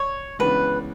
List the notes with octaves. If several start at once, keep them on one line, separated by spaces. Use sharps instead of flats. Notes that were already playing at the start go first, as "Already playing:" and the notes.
Already playing: C#5
C#2 C#3 E3 B3 D4 B4